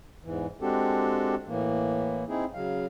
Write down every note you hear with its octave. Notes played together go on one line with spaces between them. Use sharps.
E2 G#2 E3
G#3 C4 D4 F#4 G4 A4
A2 E3 A#3
C4 D#4 E4 G#4
C#3 F#3 F5